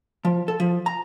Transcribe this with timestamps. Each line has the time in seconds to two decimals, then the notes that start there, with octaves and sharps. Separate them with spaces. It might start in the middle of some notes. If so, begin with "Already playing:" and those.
0.25 F3
0.48 A4
0.60 F3
0.86 A#5